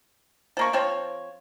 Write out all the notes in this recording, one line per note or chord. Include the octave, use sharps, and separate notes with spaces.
F3 A#3 C#6
F3 C4 C5 C#5